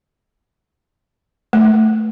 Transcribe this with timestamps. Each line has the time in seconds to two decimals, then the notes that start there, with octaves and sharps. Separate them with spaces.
1.53 A3